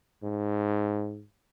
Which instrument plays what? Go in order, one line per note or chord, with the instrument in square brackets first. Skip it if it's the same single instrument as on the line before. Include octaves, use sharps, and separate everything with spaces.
[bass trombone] G#2